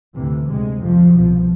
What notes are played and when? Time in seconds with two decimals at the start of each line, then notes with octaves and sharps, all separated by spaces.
0.14 D2 C3 E3
0.47 D2 C3 G#3
0.80 F2 C3 F3
1.13 C2 B2 F3